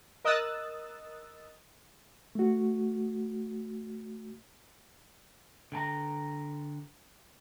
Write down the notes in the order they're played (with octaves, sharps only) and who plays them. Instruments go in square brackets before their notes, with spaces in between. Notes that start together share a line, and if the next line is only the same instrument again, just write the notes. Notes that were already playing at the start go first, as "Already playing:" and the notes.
[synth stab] A#4 D#5 D#6 E6 F#6 A6
[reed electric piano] A3 F#4
[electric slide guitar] D3 G5 A5 A#5